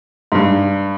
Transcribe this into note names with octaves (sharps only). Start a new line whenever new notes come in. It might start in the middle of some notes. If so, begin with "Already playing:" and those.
G#2
G2